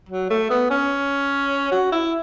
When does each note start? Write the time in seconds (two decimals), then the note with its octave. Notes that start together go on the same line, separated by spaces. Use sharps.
0.09 F#3
0.30 A3
0.50 B3
0.70 C#4
1.71 F#4
1.92 E4